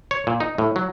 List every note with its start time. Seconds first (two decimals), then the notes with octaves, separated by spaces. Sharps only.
0.11 C#5
0.27 A#2
0.40 D#4
0.58 A2
0.76 F#3